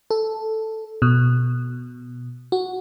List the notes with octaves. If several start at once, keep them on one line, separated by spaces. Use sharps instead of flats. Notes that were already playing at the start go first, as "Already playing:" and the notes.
A4
B2
F#4